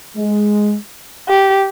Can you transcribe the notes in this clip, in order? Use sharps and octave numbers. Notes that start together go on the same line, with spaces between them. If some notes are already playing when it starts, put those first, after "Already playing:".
G#3
G4